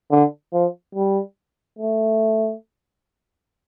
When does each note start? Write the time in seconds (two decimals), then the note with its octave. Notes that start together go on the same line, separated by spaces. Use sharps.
0.11 D3
0.53 F3
0.95 G3
1.79 A3